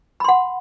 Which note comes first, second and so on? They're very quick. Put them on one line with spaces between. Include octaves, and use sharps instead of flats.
B5 C6 F#5